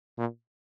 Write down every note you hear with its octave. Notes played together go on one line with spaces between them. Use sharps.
A#2